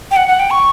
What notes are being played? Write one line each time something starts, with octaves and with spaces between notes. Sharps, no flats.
G5
F#5
F#5
G5
C#6